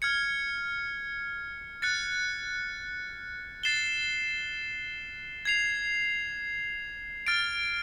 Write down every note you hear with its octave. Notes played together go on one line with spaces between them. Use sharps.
F6 G#6 C#7
F#6 A6 C#7
A6 C7 E7 G7
G#6 C7 F7
F6 A6 D7